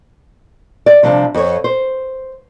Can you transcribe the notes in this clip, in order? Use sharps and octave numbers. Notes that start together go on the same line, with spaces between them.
D5
C3 F3 G3 D4
F2 C#5
C5